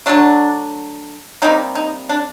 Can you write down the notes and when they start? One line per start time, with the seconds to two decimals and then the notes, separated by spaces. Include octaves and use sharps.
0.06 D3 F#3 A3 D4
1.42 C3 D#3 G3 A#3 D#4
1.75 D#4
2.09 D4